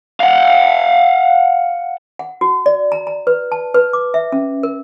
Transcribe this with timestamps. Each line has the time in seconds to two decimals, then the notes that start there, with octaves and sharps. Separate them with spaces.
0.20 F5 F#5
2.19 F#5
2.41 F#4
2.66 D5
2.92 A#5
3.07 A#5
3.27 B4
3.52 A5
3.74 B4
3.93 D6
4.14 E5
4.32 C#4
4.63 A#4